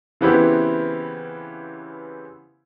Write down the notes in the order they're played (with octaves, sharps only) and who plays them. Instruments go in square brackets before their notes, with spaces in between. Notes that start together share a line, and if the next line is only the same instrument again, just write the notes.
[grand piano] C#3 E3 B3 C4 E4 G4